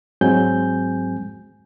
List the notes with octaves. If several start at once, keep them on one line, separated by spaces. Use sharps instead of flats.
G#2 F#3 G#3 C4 G#5 G6